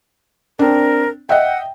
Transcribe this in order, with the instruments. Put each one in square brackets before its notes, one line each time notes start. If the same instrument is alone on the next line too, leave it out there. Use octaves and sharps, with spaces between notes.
[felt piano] C4 D4 [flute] A#4
[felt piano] D#5 E5 G5 [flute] F#5